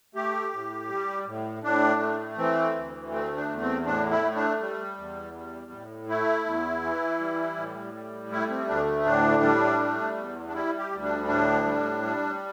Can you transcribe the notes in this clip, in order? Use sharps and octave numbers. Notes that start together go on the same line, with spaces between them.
A3 G4
A2
G3
A2
A2 D4
A3
E3 C4
D2
A3 C4
D4
E2
C4
A2 D4
E4
A3
D4
G3
E2
G3
A2
A3 E4
E2
E3
G3
A2
G3
A3 E4
C4
D2 D4
A2 D4
G3
A3
E2
D4
G3 E4
G4
D2
D4
A2 D4
G3
G3